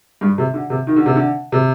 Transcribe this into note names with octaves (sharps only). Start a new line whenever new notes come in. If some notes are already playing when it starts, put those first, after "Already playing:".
G2
C3
D3
C3
D#3
D3
C3
D3
C3